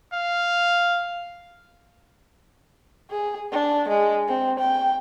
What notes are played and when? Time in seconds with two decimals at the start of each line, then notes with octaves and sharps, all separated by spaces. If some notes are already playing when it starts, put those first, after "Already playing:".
0.14 F5
3.11 G#4
3.52 D4
3.89 G#3
4.28 C4
4.59 G5